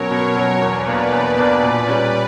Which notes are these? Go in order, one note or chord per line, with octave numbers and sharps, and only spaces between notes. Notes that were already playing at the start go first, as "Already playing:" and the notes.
Already playing: B2 F#3 C#4 A#4 C#5
B2
F#3 C#4
E2 B4 D5
B2 A#3 D4
E2
B2 A#3 D4
A#2 B4 D5
G3 C#4